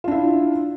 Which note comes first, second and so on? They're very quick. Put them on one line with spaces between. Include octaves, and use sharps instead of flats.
F4 D4 E4